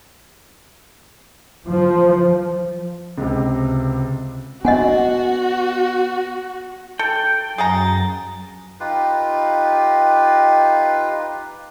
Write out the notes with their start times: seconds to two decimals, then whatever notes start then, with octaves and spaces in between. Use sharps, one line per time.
1.66 F3
3.18 C#2 C3
4.65 B3 F#4 D#5 F#5 G#5
6.99 A4 G5
7.58 F#2 G#4 F#5 A#5 A6
8.80 D#4 F4 G4 B4